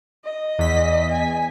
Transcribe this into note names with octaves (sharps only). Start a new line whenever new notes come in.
D#5
E2 B6
G#5